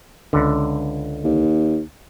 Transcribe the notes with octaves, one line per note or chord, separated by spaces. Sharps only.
C#2 D3
D#2